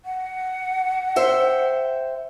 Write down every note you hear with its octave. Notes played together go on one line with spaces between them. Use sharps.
F#5
C5 E5 G5